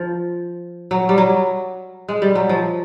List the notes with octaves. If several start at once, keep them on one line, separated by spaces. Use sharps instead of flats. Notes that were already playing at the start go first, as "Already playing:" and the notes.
Already playing: F3
F#3
G3
F#3
G#3
G3
F#3
F3